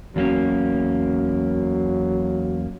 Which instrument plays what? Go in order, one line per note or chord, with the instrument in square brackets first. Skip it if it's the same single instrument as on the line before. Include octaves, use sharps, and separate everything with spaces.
[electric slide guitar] E2 A#3 C#4 [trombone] F#3